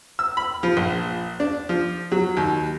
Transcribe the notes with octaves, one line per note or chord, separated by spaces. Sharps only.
E6
B5
F3
A#1
D4
F3
F#3
D#2